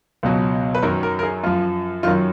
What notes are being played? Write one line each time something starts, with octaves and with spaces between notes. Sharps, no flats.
C#2 B2 F#3
B4
F#2 D#3 F#3 A#4
A#4
A#4
G#4
F#2 F3 F4
F#2 D#3 F#3 F4